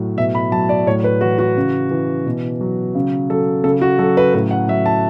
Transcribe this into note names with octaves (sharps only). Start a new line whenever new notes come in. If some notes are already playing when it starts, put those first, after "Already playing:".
Already playing: A2 F#3
B2 E5
B5
F#3 A5
D5
A2 C#5
B4
E3 F#4
F#4
C#3
E3
B2
F#3
C#3
F#3 A4
C#3 A4
F#4
F#3 A4
B4
A2 B4
F#5
F#3 E5
A5